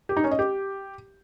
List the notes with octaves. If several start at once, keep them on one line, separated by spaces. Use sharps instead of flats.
G4
D#4
C#4
D#5
G4